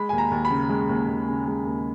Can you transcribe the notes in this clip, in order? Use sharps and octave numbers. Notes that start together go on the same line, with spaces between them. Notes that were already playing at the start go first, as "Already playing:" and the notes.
Already playing: G#3 B5
D#2 G#5
A#5
D#2
B5
C#3
G#3
D#2
D#2
C#3
G#3
D#2